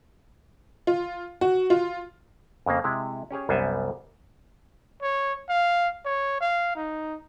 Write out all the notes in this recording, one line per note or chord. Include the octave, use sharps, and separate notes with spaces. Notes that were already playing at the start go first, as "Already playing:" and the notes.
F4
F#4
F4
F2 C#3 A#3
C3 G#3 E4
C#4 G4 G#4 C#5
C2 F#2 G3 B3 C5 G#5
C#5
F5
C#5
F5
D#4